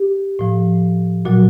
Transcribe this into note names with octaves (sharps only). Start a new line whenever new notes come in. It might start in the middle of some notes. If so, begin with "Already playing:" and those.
Already playing: G4
A2 F3
A#2 F#3 F#4